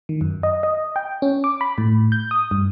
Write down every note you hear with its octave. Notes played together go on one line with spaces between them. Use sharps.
D#3
F#2
D#5
D#5
G5
C#4
D6
B5
A2
G6
D#6
G2